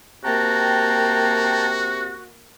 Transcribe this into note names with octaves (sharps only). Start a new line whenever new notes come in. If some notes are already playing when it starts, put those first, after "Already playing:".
C3 A#3 F#4 G5 A5 A#5